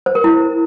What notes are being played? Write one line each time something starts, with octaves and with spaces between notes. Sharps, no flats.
C5
A#4
E4